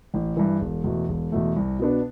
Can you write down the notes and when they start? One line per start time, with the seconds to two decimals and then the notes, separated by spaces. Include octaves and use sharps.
0.14 A1
0.37 G2 E3
0.61 E1
0.84 E2 B2 A3
1.09 E1
1.32 E2 B2 A3
1.56 C2
1.79 B2 B3 D4